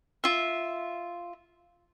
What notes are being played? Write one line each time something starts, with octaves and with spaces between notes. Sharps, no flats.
F4 E5